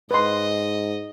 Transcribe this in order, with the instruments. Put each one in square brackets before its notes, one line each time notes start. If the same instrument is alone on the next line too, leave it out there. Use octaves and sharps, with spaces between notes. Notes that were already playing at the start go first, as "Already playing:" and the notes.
[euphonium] G#2 [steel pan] B4 C6 [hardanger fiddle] D#5